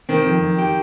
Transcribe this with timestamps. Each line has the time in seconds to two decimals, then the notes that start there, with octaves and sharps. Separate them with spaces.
0.09 D#3 C4
0.25 F2
0.42 F2
0.58 G4